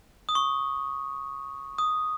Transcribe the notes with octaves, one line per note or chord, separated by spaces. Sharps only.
D#6
C#6
D#6